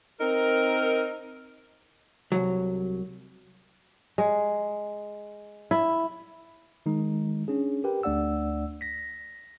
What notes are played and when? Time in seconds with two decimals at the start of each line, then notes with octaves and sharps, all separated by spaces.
0.21 C4 D#4 A#4
2.32 C2 F#3
4.18 G#3
5.71 E4
6.86 D#3 G#3 D#4
7.48 C#4 D4 G#4
7.84 G4 A#4 B4 G5
8.03 D2 A3 D4 D5 F#5 E6
8.81 A#6 B6